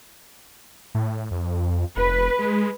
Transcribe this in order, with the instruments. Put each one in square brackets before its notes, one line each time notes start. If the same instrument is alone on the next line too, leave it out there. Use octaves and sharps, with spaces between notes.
[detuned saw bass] A2
F2
[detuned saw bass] F1 [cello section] B4
[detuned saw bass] G#3